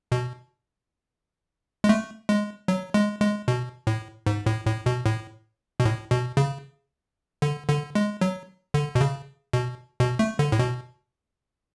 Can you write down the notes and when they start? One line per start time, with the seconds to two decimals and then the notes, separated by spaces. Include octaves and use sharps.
0.12 B2
1.84 G#3
1.89 A3
2.29 G#3
2.68 F#3
2.94 G#3
3.21 G#3
3.48 B2
3.87 A2
4.26 G#2
4.46 A2
4.66 A2
4.86 B2
5.06 A2
5.80 B2
5.85 A2
6.11 B2
6.37 C#3
7.42 D3
7.69 D3
7.95 G#3
8.21 F#3
8.74 D3
8.95 B2
9.01 C#3
9.53 B2
10.00 B2
10.19 A3
10.39 D3
10.52 A2
10.59 B2